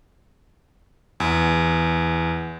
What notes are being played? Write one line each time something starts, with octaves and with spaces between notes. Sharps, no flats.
E2